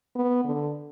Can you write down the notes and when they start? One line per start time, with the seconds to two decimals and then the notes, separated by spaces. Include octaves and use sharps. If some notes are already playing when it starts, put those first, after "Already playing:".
0.15 B3
0.44 D3